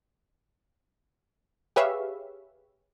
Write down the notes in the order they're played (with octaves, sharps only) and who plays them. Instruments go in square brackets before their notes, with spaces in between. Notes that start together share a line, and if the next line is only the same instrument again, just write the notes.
[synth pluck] G4 G#4 B4 C#5 E5 F5